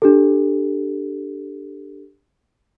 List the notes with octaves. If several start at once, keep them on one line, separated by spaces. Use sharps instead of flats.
D4 G4 A4